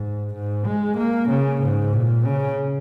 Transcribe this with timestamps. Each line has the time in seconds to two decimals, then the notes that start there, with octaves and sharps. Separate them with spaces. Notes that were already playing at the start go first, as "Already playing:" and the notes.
Already playing: G#2
0.34 G#2
0.65 G#3
0.97 A#3
1.29 C#3
1.61 G#2
1.93 A#2
2.25 C#3